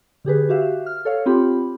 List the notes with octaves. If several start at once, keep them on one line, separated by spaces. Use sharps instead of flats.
D3 G4 G#4 B4
F#4 G4 E5 F5
F6
A4 C#5 F5
C4 F4 G4 B5